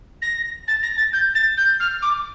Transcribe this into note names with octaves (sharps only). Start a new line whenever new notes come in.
A#6
A6
A#6
A6
G6
A6
G6
F6
D6